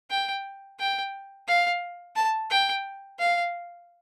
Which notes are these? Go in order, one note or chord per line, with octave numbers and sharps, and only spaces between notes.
G5
G5
F5
A5
G5
F5